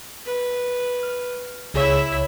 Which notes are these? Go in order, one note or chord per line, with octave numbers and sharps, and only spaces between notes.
B4
F6
C#2 E4 G#4 C#5 E5